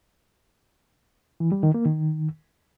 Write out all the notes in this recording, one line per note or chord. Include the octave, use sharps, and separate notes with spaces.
E3
G3
D#3
A#3
D#3